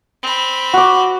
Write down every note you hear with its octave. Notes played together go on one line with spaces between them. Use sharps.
C4 B5
F#4 D6